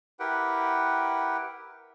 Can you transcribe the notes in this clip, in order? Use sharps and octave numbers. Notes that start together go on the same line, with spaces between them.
E4 G4 A#4 B4 F#5 G5